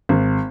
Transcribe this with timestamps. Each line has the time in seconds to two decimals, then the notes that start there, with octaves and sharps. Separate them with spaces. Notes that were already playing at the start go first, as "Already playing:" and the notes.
0.09 G#1